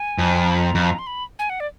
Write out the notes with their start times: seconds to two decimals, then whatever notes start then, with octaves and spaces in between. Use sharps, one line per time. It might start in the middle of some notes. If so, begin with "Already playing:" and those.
Already playing: G#5
0.18 F2
0.43 A#5
0.49 B5
0.57 A#5
0.75 F2
0.99 C6
1.07 B5
1.39 G#5
1.50 F#5
1.60 D5